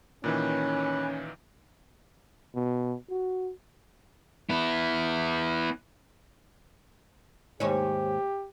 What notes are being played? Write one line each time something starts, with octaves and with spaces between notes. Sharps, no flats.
A#2 D#3 E3 C#4 B4
B2
F#4
B3 E4
D#2 G#2 G4 C#5